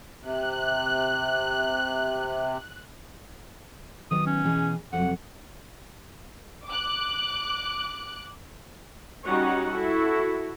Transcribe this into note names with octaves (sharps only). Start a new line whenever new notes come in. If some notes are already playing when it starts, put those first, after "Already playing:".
C3 F#6
D#3 F#3 B3 D#6
C#4
B2 E3 G#4
F2 C3 F#3 F#5
D6 F#6
G3 C#4 D#4 F#4 C#5 F#5
E4 F#4 A4